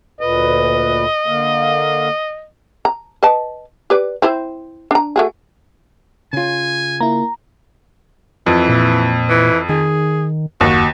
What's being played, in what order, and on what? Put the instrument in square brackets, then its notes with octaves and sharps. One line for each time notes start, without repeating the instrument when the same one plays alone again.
[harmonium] D2 A#2 B4 [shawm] D#5
[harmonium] D3 A#3 F5
[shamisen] A#5
B4 D#5 A5
G4 B4 D5
C4 E4 C5
D4 A#5
A3 F#4 G#4
[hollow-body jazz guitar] C#3 F4 [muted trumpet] G#5
[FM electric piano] A#3 E4 [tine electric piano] A#5
[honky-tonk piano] F2 [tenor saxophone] E3
[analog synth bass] A#2
[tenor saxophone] E3
[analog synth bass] D#3 [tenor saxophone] G#4
[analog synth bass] F#1 [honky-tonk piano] D#2 [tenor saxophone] F#4